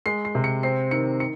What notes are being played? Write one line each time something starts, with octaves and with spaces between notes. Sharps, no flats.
G#3 C7
C7
C3
C#7
C4 C7
D#3 C#7
C#7